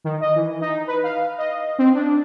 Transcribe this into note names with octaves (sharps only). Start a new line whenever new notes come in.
D#3
D#5
E3
D#4
B4
F5
D#5
C4
D4